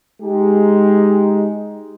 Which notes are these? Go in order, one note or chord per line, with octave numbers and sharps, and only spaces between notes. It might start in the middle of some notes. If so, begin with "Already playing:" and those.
G#3 D#4 G4